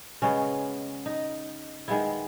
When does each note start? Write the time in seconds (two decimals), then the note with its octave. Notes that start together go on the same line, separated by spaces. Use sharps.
0.22 C#3 G#3 B3 C#4
1.06 D#4
1.88 D#3 G#3 B3 E4